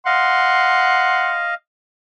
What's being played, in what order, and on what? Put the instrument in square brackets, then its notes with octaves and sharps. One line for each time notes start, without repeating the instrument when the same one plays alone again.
[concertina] D#5 F5 [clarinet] F#5 [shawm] C6